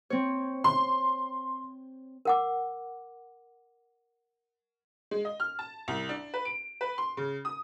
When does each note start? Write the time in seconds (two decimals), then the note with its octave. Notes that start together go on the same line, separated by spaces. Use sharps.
0.10 C4 C#5
0.64 C6
2.25 A#4 F#5 D6
5.11 G#3
5.25 D#5
5.40 F6
5.59 A5
5.88 C2
6.09 D4
6.34 B4
6.45 D7
6.81 B4
6.98 C6
7.17 C#3
7.45 D#6